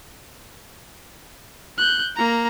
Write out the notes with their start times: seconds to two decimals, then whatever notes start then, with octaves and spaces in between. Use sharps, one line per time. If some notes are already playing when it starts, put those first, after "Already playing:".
1.78 F#6 G6
2.16 A#3 A#5